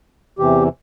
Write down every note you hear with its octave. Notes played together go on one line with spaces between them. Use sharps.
E2 C3 E3 G4